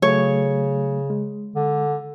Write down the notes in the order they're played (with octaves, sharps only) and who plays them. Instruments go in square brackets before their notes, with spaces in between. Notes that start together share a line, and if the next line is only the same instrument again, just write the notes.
[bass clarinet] C#3 [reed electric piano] F#3 A3 [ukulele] C#5
[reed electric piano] G#3
[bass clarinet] D3